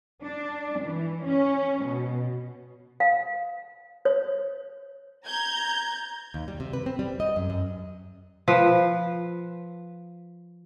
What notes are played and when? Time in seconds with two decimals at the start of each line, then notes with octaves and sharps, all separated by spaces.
0.24 D4
0.82 E3
1.26 C#4
1.85 B2
3.00 F5
4.05 C#5
5.26 A#5 G6 G#6
6.34 D#2
6.48 G3
6.60 C3
6.73 B4
6.86 C4
6.99 G3
7.20 D#5
7.36 F#2
7.50 F#2
8.48 F3 B4